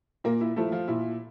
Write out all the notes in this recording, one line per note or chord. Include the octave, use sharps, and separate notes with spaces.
A#2 A#3 A#4
E4
F3 A3 E4
F3 F4
A#2 E4